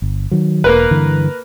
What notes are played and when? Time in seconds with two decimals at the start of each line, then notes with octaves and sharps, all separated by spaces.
0.02 G1
0.31 D#3 F#3
0.64 E1 A#3 A#4 B4
0.91 G2 D3 E3